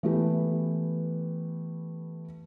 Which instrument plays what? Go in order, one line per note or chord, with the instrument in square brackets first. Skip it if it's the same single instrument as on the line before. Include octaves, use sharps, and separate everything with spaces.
[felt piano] E3 A3 B3 G4